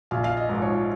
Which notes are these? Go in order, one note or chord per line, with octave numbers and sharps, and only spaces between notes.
A#1 F5
F5
D#5
G#2 F3
C#5